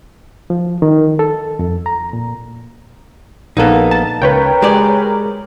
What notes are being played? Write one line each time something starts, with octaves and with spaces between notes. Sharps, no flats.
F3
D#3
A4
F2
A#5
A#2
A#1 A#3 B3 D#4 A4
A5
C#2 A#4 B4 C#5 G5
G#3 G4 D5 G#5